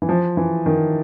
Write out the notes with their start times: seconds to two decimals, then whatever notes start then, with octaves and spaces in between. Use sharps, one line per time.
0.02 E3
0.09 F3
0.37 E3
0.66 D#3